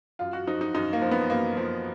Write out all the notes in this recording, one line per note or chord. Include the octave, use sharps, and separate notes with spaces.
F#2 F4
F#4
F3 D#4
D#4
F#2 D#4
A#3
F3
B3
F#2 A#3
F3